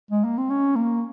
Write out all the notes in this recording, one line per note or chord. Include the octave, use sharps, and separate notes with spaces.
G#3
A#3
C4
C#4
A#3